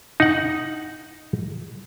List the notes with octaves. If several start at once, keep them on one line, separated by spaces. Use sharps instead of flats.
D#4 F#5